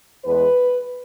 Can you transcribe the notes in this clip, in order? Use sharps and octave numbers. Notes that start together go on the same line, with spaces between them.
E2 E3 G#3 B4